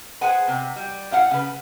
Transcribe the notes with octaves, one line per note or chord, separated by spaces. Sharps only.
G#4 B4 C5 F#5 G#5
C3
G3
A2 F5 F#5
C#3 B4